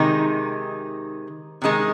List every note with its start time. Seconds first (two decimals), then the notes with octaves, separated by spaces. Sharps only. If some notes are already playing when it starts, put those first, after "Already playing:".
Already playing: C3 D#3 G#3 D#4
1.62 C3 D#3 G#3 D#4